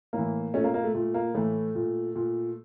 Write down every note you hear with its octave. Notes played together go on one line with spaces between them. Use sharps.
A2 E3 A#3
A#2 A3 C#4
A#3
A#3
A3
A#2 A3
A#3
A2 E3 A3
A#2
A#2